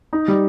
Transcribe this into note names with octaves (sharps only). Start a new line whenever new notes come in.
D#4
G3